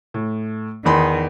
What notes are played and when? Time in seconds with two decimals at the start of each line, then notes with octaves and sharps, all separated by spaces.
0.14 A2
0.85 E2 D#3 B5 C6